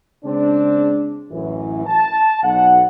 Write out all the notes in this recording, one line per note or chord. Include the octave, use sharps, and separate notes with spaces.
C#3 G#3 C4 D4
A1 F#2 E3
A5
B1 F#5